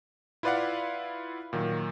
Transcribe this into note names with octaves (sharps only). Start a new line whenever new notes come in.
E4 F4 B4 D5 F5 F#5
A#2 D#3 F#3